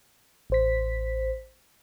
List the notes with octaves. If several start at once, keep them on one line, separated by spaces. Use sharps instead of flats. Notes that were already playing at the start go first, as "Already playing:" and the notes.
A1 C5 B6